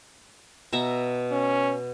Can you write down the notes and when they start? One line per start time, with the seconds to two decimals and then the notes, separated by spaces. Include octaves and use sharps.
0.73 B2 E5 A#5
1.32 C#4